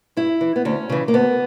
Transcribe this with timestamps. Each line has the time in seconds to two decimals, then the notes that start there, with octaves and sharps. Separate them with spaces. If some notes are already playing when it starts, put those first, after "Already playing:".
0.17 G2 E4
0.41 E3
0.56 B3
0.65 D2 C#4
0.89 C#3 E3
1.08 A#3
1.14 D2 B3